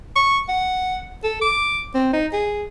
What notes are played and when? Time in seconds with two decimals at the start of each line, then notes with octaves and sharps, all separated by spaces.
0.16 C#6
0.48 F#5
1.24 A4
1.41 D6
1.95 C4
2.13 D#4
2.33 G#4